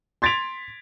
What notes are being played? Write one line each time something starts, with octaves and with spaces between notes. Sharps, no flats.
C6 G#6 A6 B6 D7 F7